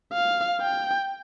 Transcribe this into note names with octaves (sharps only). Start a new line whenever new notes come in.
F5
G5